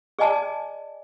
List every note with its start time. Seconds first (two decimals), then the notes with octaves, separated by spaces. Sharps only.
0.19 G#4 D5 D#5 G#5 A5